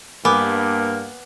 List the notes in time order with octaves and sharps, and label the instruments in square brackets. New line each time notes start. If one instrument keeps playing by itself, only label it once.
[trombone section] G2 [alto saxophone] A#3 [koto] B3 [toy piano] G#5 D6